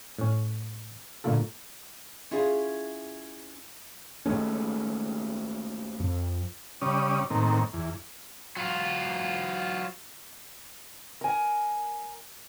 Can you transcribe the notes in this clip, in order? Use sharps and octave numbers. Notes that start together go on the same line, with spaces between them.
A2 C#4
A#2 D3 A3 A#3 F4 A4
C#4 E4 F4 G#4
D#2 G#3 A3 C#4
F2
C#3 G3 C#4 D5 D#6
A2 D#3 A#3 C4
E2
F#3 F4
A#4 G#5